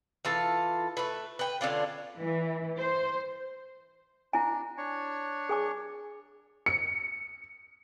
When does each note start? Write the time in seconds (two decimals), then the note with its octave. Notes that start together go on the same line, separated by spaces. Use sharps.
0.25 E3 F4 A4
0.97 A3 B4
1.39 B4 G5
1.61 D3 C#4 D4 F4
2.18 E3
2.79 C5
4.33 D4 E4 G#5
4.78 D4 C#5
5.49 G#4 G#5 D6
6.66 C#7